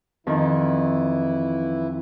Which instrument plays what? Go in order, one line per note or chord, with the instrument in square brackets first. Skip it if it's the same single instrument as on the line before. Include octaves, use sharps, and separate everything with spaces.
[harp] F2 D#3 [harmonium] E3 E4